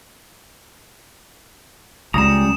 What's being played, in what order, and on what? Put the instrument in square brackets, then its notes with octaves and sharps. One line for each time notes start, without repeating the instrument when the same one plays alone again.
[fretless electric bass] C#2 [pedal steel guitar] G3 C#4 A#5 [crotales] D#6 E7